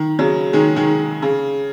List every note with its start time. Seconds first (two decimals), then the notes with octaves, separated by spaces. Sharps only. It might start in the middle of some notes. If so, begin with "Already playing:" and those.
Already playing: D#3
0.19 C#3 F#3
0.53 D#3 G#3
0.76 D#3 G#3
1.22 C#3